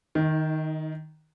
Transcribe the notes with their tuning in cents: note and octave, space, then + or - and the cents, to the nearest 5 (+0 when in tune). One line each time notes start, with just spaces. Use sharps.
D#3 +0 D#4 +35